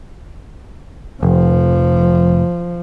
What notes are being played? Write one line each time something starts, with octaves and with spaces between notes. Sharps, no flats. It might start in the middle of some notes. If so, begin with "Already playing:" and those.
F1 F3